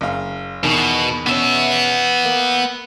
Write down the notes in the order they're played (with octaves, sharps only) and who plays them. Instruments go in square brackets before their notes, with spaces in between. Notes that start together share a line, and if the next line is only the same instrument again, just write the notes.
[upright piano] F#1 F5
[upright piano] E2 D#3 [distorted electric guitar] B2
[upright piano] B2 C#4 [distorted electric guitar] B3 E5
[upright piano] A#3